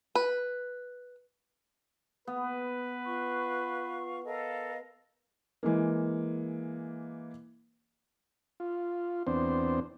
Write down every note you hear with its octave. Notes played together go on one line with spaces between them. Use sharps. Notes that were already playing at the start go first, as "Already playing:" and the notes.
B4
B3 B4
F4 C#6
A4 A#4 D#5 F5
E3 G#3 A#3
F4
E2 B3 C4 D4 C5